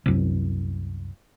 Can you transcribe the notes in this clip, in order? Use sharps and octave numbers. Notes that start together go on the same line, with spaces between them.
C2 F#2